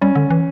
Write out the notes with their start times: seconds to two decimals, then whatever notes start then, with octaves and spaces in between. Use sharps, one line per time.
0.01 G3 C#4
0.15 D3
0.30 E3